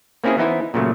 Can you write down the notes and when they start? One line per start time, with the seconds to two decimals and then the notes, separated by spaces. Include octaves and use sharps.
0.24 A#3 C4 C#4 E4 G#4
0.37 E3 B3 D#4 E4 C5
0.74 A#2 C#3 F#3 A3